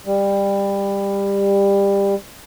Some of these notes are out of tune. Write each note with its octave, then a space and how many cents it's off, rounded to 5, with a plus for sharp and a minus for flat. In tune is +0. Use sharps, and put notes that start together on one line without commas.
G3 +20